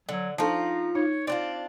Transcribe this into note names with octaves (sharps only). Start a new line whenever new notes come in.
D3 F#3
F3 D4 D#4 F4 A4 A5
D#4 C#5
C4 D4 F4 D5